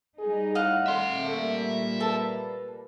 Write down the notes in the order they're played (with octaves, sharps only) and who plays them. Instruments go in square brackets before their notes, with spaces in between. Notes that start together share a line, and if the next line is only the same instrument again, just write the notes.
[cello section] G3 D#4 [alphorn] G#4
[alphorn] A2 [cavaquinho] D#5 F5 F#5
[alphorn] A3 [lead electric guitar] E5 C6
[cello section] A#2 G3 A#3 [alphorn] A3
[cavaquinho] A4 A5 [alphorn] B4